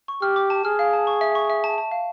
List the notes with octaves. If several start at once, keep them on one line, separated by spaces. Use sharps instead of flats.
C#6
G4 F6
D6
A5
G#4 F6
F5
A5
C#6
E5
C#6
E5
A5
A5
F5